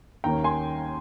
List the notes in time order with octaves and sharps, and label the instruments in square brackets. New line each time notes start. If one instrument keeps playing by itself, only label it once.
[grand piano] D#2 D#3 A#3 C#4 G5 A#5
G#5 C6